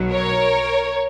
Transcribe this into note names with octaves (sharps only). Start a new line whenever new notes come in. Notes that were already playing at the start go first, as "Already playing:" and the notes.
Already playing: B1 B2 F#3
A#4 C#5